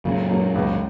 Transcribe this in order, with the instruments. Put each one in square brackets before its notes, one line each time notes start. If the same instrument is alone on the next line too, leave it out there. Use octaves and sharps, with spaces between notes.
[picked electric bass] F#2 A#2 [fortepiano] C#3
[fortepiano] F#3 A#3
C#2